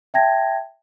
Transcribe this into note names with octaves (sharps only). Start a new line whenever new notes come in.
E5 G5 A5 G#6 A#6